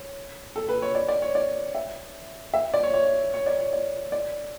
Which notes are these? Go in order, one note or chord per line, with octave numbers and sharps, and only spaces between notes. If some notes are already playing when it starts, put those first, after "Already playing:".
Already playing: C#5
A4
B4
C#5
D5
D5
C#5
D5
E5
E5
D5
C#5
C#5
C#5
D5
C#5
D5
D5